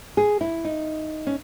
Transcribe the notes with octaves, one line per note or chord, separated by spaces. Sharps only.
G#4
E4
D#4
C#4